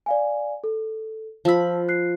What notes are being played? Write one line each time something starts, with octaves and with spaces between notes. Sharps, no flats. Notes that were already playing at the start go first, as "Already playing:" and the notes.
D5 F5 G#5
A4
F3 A5 B5 E6
F#6 C7